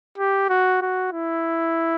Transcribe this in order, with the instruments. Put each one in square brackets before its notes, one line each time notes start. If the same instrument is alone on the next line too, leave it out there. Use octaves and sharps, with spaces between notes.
[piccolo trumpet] G4
F#4
F#4
E4